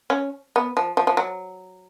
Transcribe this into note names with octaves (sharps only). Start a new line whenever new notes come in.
C#4
B3
F3
F3
F3
F#3